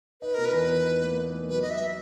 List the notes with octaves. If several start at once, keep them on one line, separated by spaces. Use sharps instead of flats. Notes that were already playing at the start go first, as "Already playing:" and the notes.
D#4 B4
B2 A#4
B4
E2
B2
D#4
A#3
D#4
A#3
F#3 B4
F#3 D#5
E5